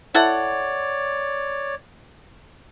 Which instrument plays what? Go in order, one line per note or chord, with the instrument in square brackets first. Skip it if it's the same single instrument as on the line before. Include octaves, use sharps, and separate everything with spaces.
[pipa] E4 A4 F#5 [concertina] C#5 D5